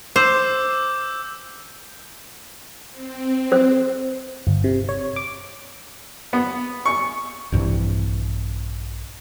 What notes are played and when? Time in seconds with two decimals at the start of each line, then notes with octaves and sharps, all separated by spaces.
0.16 C5 D6 E6 G6
2.91 C4
3.52 C5
4.47 G1
4.64 C3
4.89 C#5
5.16 D6
6.33 B3
6.86 C#6
7.52 A#1 G2 C3 E3